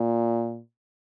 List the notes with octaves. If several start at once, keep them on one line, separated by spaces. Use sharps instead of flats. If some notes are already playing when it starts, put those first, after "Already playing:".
Already playing: A#2